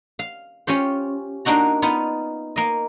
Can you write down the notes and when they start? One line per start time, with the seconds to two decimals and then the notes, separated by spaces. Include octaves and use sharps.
0.19 F5
0.67 C#4 F4 G4 C5
1.45 A#3 D4 D#4 F#4 A#5
1.82 B3 D#4 F4
2.56 A#3 D#5